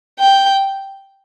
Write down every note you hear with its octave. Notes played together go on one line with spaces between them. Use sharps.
G5